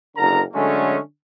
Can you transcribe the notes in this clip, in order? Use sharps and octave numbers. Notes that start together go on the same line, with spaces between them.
F#1 D3 A#4 A#5
D3 F#3 G#3 A3 C#4